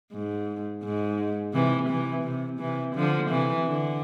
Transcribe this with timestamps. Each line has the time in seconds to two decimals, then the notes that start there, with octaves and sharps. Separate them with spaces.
0.12 G#2
0.83 G#2
1.53 C3 E3
1.89 C3 E3
2.24 C3
2.59 C3 E3
2.95 D3 F3
3.31 C3 E3
3.65 D3